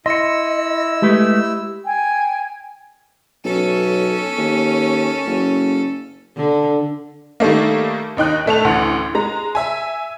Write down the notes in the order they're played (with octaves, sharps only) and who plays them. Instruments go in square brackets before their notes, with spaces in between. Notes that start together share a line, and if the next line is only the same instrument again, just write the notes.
[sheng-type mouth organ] E4 E6 [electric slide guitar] D#5 [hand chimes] C6 C#7
[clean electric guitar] G#3 A3 B4 [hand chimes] G4
[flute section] G5 G#5
[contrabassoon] B1 [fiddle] C#4 A4
[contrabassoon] D#2
F#1
[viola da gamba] D3
[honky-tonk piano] D#3 G3 A3 A#3
D#2 D#4 G5 F#6
A2 A3 A5 F7
A1 D2 F#5
G#3 A#5
E5 G#5